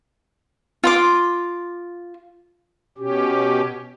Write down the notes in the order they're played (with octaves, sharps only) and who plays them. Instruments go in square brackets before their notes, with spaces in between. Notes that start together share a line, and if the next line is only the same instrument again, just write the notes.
[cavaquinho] F4 C6 D6
[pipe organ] B2 C#4 G4